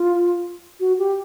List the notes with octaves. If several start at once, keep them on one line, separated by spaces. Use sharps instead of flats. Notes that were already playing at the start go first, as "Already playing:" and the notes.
Already playing: F4
F#4
G4